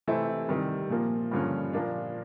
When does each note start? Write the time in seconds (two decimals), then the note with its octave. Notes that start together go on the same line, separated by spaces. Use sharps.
0.07 C3 E3 A3 C4 E4
0.49 C3 D#3 G3
0.90 A#2 F3 A#3
1.31 G2 D3 F3 A#3 C#4
1.73 A#2 F3 A#3 D4